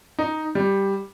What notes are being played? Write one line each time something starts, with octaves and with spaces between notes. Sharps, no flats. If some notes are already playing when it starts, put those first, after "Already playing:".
D#4
G3